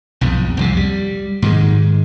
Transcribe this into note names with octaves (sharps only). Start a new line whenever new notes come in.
B1 F2 G#2
C2 F2 C3
G3
G#2 D#3 G#3